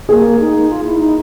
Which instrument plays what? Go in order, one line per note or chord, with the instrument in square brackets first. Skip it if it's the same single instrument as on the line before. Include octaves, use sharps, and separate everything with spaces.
[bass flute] A#3 [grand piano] G#4
[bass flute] D#4
F4
E4
D#4